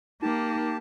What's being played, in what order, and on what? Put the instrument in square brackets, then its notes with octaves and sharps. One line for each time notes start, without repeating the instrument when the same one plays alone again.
[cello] A#3 [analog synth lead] D#4 [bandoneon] G4 A5